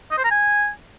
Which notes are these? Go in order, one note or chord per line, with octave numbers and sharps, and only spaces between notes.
D#5
C5
A#5
G#5